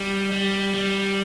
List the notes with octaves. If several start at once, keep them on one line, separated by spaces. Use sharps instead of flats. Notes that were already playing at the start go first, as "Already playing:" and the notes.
Already playing: G3
G3
G3